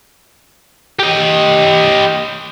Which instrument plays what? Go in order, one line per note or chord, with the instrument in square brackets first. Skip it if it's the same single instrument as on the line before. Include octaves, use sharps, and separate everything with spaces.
[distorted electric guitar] G4 D#5